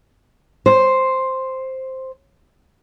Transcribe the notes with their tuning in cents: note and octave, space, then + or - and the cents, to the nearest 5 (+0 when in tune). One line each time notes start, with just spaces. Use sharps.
C5 +0